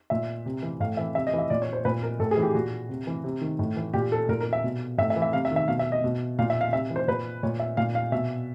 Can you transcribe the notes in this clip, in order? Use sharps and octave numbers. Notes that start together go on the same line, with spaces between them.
A#2 E5
C3
E3
A2 F5
E3 E5
C3 E5
D#5
E3
E5
A#2 D5
C#5
C5
A#2 B4
A#4
A2 A4
G#4
E3
G4
A#2 F#4
C3
E3
C3
D#3
A2
E3
A#2 G4
A4
A#2 A#4
A#4
E5
B2
A2 E5
E5
E3
E5
C3 F5
E5
D#3
E5
B2 F5
E5
D#5
B2
A#2 F5
E5
F5
C3 E5
E3
C5
A#2 B4
A#2 C#5
E5
A#2 F5
F5
B2 E5